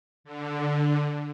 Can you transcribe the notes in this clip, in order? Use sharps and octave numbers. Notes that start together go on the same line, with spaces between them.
D3